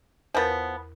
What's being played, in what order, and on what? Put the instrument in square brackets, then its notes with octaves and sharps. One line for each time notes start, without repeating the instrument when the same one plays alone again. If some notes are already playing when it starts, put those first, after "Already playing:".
[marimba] E2 A#4 A6 [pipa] F3 B3